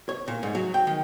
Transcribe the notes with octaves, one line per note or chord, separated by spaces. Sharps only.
C#5
A#2
G#2
F#3
G5
D#3